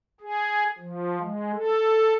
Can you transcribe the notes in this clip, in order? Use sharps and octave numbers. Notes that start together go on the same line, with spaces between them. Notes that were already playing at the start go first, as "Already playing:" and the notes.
G#4
F3
G#3
A4